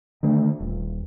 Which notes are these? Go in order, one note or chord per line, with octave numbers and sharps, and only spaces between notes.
D3 D#3 A3
D#1